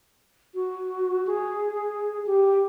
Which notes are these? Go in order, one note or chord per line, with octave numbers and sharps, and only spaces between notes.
F#4
G#4
G4